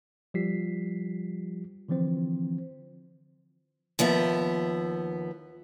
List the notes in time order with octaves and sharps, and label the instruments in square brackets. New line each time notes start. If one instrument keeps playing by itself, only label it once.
[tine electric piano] F3 G3 F4 G4 B6 C7
D3 E3 F3 C4 C5
[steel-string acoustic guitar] D#2 F3 B3 E5